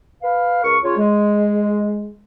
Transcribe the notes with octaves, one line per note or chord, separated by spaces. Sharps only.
B4 F5
C#2 A#4 C#6
C#3 F4 C#5
G#3